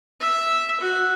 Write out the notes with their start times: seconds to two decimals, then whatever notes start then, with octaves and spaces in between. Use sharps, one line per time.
0.21 E5
0.81 F#4